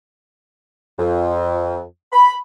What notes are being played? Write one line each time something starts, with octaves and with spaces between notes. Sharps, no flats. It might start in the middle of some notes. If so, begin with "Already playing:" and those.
F2
B5